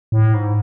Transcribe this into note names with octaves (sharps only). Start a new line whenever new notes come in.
A2
G#2